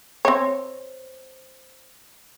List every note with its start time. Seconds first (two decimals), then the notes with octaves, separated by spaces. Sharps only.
0.25 C4 C#5